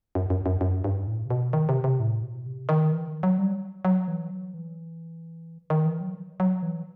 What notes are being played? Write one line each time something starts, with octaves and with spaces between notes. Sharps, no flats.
F#2
F#2
F#2
F#2
G2
A2
C3
B2
D#3
C3
C3
A2
B2
C3
D#3
E3
D#3
F#3
G3
F#3
E3
F#3
E3
D#3
E3
F#3
F#3
E3